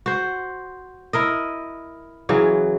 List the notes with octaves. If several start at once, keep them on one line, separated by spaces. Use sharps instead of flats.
F#4 C5
E4 A#4 D#5
C#3 E3 F#3